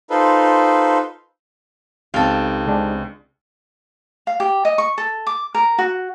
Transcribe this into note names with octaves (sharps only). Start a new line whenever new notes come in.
D#4 F4 A4 B4 C5
C#2 C4 D#4 G4 A4 F5
C3 G#3 D4
F5
G4
D#5
C#6
A4
D6
A#4
F#4